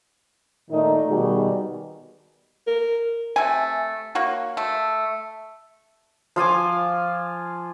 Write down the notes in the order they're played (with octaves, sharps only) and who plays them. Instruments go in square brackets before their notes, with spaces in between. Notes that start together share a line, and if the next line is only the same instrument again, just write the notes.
[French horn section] A#2 D#3 A3 D#4
B2 D#3 G3 F#4 G#4
[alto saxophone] A#4
[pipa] C3 A3 G#5
A#3 F#4 C#5
A3
[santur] F3 F4 G#5 D6